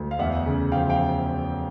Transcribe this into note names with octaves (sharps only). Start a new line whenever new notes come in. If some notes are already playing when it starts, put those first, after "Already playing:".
Already playing: D2
F5
E2 E5 F#5
C#3
F3 F5 G5
F5 G5